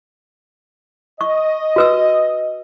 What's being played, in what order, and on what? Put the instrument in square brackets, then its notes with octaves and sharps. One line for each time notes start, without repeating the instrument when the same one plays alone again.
[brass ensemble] D#5 [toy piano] C#6
[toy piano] F#4 B4 E6